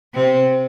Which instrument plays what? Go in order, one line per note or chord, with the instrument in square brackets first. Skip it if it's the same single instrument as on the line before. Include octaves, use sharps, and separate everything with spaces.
[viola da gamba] C3 C4